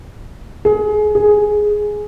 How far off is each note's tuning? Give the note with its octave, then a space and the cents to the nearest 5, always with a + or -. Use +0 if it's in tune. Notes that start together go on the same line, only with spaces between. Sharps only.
G#4 +25
G#4 +5